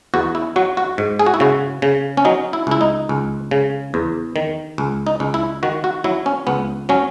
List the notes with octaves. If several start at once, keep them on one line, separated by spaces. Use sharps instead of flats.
E2 F#4
E4
F#3 F#4
F#4
G#2
G#4
F#4
E4
C#3 F#4
C#3
C#4
F#3 D#4
E4
C#2 E4
D#4
C#2
C#3
E2
D#3
C#2
D#4
C#2
E4
D#3 F#4
F#4
F#3 E4
C#4
C#2 B3
F#3 C#4